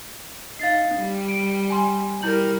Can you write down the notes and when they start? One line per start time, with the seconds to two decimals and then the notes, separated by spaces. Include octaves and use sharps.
0.59 D#4 F5 A6 C7
0.96 G3
1.28 D7
1.70 G#5 C6
2.22 G3 E4 A#4 G6 F#7